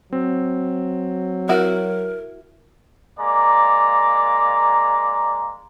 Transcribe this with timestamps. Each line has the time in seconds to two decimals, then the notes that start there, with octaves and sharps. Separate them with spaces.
0.13 F#3 C4
1.49 E4 F#4 A#4
3.19 G#3 A#3 D5 A#5